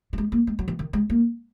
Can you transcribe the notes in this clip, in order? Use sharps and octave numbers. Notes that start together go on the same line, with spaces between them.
F#3
G#3
A#3
G#3
F#3
E3
D#3
G#3
A#3